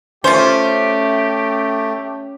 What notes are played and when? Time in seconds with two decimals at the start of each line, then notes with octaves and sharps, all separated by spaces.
0.24 A3 C#4 F4 G4 C5